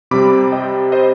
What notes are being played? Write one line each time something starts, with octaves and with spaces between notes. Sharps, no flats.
C3 G3 C4 B5 D6
D#5 G5
C5 D#5